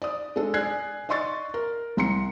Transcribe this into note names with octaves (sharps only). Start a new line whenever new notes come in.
D5 D#6
G#3 D4 A4
D5 G#5 F#6 G#6 C7
D5 D#5 C6 C#6 A6
A#4
C2 A#5 C6 C#7